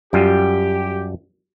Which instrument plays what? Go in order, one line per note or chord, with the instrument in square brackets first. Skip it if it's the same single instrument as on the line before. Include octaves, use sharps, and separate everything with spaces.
[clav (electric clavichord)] F#2 G3 F4 [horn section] G4